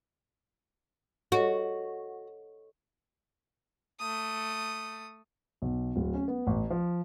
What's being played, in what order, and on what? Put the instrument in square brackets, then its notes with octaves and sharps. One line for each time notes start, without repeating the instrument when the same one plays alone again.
[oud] F#4 [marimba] A4 C#5 D#5
[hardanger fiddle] A3 D#6
[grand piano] B1
D1
C#4
B3
A1
F3